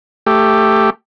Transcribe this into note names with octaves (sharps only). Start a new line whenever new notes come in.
A3 G4